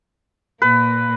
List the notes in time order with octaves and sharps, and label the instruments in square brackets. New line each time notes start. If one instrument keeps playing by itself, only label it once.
[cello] A#2 A#3 [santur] B4